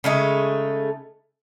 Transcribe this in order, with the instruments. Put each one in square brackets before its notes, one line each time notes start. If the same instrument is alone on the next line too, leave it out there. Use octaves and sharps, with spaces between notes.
[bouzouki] C#3 G#3 A3 D#4